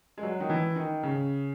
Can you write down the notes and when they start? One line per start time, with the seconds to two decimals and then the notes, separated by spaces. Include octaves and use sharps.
0.18 G#3
0.23 F#3
0.40 D#3
0.50 E3
0.76 D#3
1.03 C#3